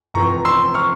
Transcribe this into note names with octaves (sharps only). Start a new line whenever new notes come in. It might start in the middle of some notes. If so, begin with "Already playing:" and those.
F1 F2 E3 A#5 C#6
C6 E6
C#6 F6